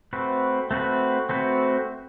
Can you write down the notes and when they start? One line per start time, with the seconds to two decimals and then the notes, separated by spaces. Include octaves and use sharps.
0.13 A3 C4 F#4 B4
0.71 A3 C4 F#4 B4
1.29 A3 C4 F#4 B4